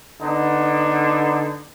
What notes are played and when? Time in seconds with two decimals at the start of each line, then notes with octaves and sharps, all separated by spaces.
0.20 D3 B3 D#4